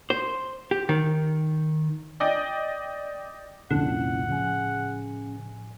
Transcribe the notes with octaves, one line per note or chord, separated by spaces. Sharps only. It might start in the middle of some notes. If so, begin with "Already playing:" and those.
C5
G4
D#3
D5 D#5 G5
C2 F2 A#2 D3 C4 C#4 E4 F#5
A2 C#3 F3 G#5